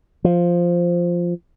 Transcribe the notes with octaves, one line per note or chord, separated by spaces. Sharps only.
F3